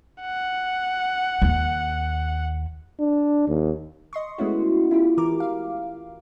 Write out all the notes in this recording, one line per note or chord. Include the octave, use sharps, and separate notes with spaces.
F#5
D#2
D4
D#2
D#5 C6 C#6
G#3 A3 B3 C#4 E4 F#4
E4 F4 G4
E3 A#4 D6
F5